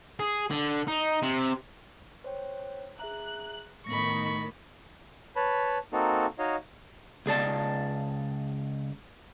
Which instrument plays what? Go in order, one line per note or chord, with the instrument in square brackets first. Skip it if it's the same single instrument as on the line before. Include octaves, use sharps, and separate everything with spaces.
[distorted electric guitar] G#4
D3
D#4
C3
[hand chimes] C5 C#5 G5
[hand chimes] G#4 E5 A#5 [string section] F#6
[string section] A2 D#3 [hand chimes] B3 A#6 [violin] B5 C#6
[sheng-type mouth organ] B4 C#5 A5 B5
A#3 C4 D#4 F#4 A4
D#4 F#4 C#5 D#5 F5
[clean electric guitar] C#2 G#4 D5 A5